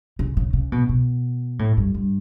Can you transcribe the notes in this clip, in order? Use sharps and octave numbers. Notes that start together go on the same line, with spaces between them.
C#3
C#3
C#3
B2
B2
A2
G2
G2